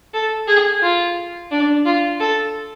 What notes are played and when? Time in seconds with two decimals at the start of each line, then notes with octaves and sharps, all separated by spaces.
0.14 A4
0.48 G#4
0.82 F4
1.51 D4
1.85 F4
2.20 A4